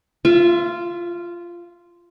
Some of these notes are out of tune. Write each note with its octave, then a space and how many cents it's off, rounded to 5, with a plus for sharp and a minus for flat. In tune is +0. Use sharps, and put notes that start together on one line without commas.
F4 -10 E5 +30